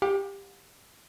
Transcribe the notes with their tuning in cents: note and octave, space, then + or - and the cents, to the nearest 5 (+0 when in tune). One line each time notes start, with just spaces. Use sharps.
G4 +15 F#5 -45